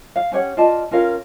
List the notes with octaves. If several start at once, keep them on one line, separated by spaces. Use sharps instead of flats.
F5
C#4 G4 C#5 F#5
F4 D5 D#5 A5
C#4 F4 A#4 F5